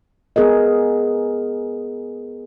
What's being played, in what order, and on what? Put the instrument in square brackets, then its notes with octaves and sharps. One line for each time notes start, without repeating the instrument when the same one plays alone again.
[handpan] B3 G#4 A#4 D#5